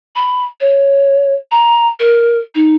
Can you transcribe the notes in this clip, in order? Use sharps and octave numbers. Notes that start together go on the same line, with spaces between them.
B5
C#5
A#5
A#4
D#4